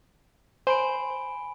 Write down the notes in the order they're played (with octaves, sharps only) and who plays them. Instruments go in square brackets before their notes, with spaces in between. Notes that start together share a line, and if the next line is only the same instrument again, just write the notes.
[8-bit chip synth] C5 [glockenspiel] G#5 B5 D7